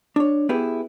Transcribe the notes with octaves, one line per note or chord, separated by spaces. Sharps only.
D4 C#5
B3 E4 G4 G#4 B4